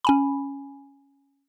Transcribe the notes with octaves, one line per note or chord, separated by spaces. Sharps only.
C#4 G#5 B5